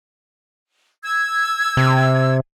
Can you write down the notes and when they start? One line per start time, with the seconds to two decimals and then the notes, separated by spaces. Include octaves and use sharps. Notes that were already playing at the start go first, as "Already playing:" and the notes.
1.04 E6 G#6
1.77 C3